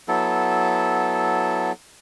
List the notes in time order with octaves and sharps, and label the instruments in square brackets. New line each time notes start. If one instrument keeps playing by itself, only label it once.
[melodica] F#3 B3 E4 A4